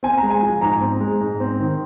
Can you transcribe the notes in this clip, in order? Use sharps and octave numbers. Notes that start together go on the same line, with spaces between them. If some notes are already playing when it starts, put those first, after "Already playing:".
C4 G#5
A#5
G#3
G#5
F3
G#2 A#5
C4
G#3
G#2
C4
D#3